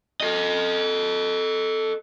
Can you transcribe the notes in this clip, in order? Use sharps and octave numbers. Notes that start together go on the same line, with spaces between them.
A4 D#5